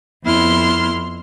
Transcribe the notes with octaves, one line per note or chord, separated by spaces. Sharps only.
F2 B3 E4 C6 F6